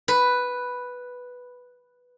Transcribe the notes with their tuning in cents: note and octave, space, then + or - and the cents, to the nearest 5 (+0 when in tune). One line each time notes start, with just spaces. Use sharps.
B4 +0